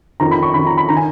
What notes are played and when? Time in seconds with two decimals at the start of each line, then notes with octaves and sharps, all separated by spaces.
0.20 F2 D#3 A#5
0.31 B5
0.43 C#6
0.54 F2 D#3 B5
0.67 A#5
0.78 B5
0.89 D#3 A#5
0.97 G#5